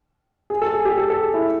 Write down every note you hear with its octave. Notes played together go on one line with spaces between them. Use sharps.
G#4
A4
G#4
G4
A4
A4
G#4
E4